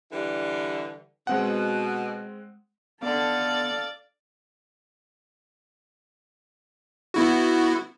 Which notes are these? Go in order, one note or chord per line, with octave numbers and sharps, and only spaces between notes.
D3 E3 G3
B2 G#3 C4 F#5
D3 B3 A4 D5 F5
B3 E4 F#4